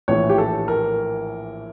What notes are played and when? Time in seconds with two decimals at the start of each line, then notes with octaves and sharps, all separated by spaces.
0.08 A#1 A2 E3 C#5
0.29 G4
0.38 A4
0.68 A#4